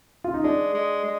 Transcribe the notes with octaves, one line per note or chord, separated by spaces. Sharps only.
F4
D#4
G#3 D4
G#3
G#3